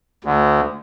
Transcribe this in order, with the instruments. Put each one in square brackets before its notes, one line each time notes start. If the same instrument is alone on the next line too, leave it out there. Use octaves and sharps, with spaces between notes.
[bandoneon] D2